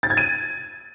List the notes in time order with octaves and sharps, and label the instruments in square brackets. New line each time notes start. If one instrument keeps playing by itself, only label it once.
[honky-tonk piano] A6
G#6
D#7